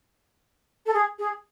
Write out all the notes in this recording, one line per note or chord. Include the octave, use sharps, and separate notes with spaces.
A4
G#4
G#4